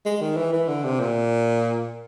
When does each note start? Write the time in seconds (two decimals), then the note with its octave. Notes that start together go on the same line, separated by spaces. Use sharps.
0.05 G#3
0.21 D#3
0.37 E3
0.53 E3
0.68 D3
0.84 C3
1.00 A#2